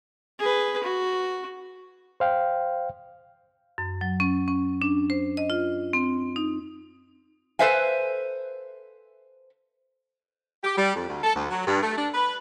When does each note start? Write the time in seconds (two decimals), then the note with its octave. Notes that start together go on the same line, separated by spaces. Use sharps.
0.39 G#4 B4
0.84 F#4
2.20 C5 F5 G5
3.78 F#2
4.01 F#3
4.20 C#4
4.48 C#4
4.82 D4
5.10 C5
5.37 D#5
5.50 F4
5.93 C4
6.36 D#4
7.59 A4 B4 C5 E5 F5 G#5
10.64 G4
10.78 G3
10.95 F2
11.09 D2
11.24 A4
11.36 D2
11.50 F#3
11.67 G2
11.83 A3
11.98 D4
12.14 B4